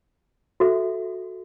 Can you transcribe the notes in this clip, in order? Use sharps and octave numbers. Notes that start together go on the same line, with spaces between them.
F#4 A4 E5